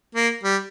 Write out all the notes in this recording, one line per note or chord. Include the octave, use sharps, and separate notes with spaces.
A#3
G3